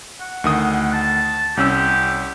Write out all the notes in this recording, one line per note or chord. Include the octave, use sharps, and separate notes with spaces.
F#5
D2 D#3 D#6
A5
C2 C#4 G4 E6